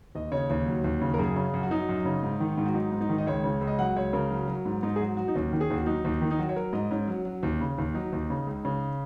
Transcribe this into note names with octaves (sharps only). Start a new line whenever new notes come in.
D#2 D#5
C#3 C#5
D#2 C#5
F#3
D#2
C#3
A#4
F#2 G#4
C#3
F#2
F#4
F#3 D#4
F#2
C#3
G#2
D#3
G#2
F#4
F#3 D#4
G#2
D#4
D#3
D#5
C#2 C#5
C#3
C#2
D#5
F#3 F#5
C#2 C#5
C#3 A#4
F#3
F#3
G#2
G#2 D#4
G#4
F#3 F#4
F#3 F#4
D#4
D#2 C#4
D#3
G#4
D#2 F#4
F#3 D#4
D#2
D#3
D#4
F#3 F#4
C#5
F#3 A#4
G#2 D#5
G#2 C#4
F#3
F#3
D#2
C#3
D#2
F#3 D#4
D#2
C#3
C#2
C#3